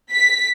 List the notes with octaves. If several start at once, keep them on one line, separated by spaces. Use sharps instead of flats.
B6